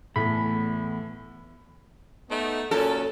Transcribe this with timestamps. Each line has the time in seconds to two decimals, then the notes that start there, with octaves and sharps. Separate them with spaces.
0.16 E2 A2 A3 B5
2.30 A3 B3 D#4
2.71 F#2 A#2 C#4 A4